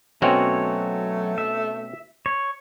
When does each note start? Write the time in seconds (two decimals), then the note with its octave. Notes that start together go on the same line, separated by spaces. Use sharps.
0.22 B2 F#3 A3 C4 C#4 F#4 C#5
1.38 E5
2.26 C#5